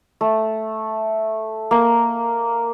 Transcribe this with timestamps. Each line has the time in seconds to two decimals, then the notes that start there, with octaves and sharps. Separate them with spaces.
0.21 A3
1.71 A#3